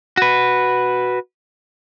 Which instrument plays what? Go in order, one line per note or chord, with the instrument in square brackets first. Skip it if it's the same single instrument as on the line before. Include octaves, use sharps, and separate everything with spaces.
[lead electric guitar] F#4 B4